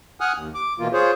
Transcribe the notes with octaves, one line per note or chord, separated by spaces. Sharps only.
F#5 G#5 D#6 F6 F#6
D#2
D6
B2 E3 A#3 F4
F4 G#4 C5 C#5